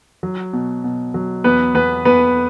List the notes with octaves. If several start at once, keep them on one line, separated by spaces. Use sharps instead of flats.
F#3
B2
B2
F#3
E2 B3 B4
E2 B3 B4
E2 B3 B4